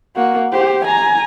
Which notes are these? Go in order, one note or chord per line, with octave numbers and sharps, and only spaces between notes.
A#3 F#4
G4 C5
G#5 A#5